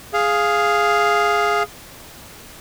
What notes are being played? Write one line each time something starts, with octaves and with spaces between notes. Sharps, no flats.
G#4 F5